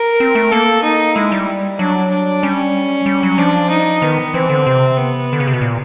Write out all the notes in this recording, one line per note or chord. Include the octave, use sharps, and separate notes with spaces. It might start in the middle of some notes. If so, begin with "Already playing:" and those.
Already playing: A#4
C4
A3
A#3 A4
D#4
G#3 E4
G3
F#3 D4
D4
G3 C#4
G3
F#3
F3 D4
D#4
D#3 B3
E3 C4
D3
C3
B3
D3
C#3
C3
B2
A#2